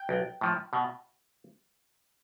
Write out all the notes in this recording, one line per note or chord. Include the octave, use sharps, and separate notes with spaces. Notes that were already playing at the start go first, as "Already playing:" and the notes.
Already playing: G5
B1
A2 F3
B2